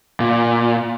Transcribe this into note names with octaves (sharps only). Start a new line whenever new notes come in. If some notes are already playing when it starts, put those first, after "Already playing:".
A#2